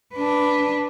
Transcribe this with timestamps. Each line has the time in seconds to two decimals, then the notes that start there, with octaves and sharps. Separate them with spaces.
0.15 D4 B4